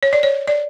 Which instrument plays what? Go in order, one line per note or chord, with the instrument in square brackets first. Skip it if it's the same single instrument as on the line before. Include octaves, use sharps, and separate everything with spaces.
[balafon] C#5
D5
C#5
D5